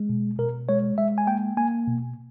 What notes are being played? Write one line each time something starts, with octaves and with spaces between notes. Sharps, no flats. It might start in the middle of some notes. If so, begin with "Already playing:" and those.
Already playing: G#3
B2
B2 A#4
G#3 C#5
G#3 E5
G#5
A#3 G5
A#3 G#5
B2